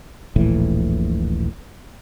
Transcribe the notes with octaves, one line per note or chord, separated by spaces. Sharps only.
D#1 A#1 A2 E3